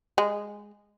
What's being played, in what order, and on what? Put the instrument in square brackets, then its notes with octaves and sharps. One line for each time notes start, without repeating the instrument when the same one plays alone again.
[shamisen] G#3